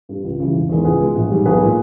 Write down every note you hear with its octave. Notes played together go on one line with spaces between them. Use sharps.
G2 G3
C#2
C#3 E3 G3
E1
E2 D#3 G#3
C#2 G#4 B4
B2 G#3
A#1
G#2 G3
B1 G#4 B4
A#2 G#3